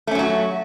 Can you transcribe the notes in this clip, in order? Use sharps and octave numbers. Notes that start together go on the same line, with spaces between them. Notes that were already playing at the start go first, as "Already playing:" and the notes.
F#3 A3 C#4 F#4